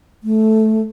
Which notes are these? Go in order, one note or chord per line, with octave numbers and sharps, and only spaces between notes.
A3